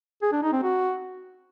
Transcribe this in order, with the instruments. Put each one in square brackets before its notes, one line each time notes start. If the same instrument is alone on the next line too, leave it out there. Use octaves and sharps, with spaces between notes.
[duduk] G#4
D4
D#4
C4
F#4